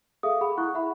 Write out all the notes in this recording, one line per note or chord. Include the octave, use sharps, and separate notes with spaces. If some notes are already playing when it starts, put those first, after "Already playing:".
G#4 A4 E5 F5 D#6
G#4 F#5 B5
E4 C#6 F#6
E5 F#5 B5